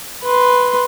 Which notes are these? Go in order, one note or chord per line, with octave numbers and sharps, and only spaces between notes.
B4 C6